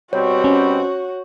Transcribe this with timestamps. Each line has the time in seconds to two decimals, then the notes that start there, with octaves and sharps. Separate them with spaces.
0.13 B2 G3 C4 F#4 C#5
0.44 C#4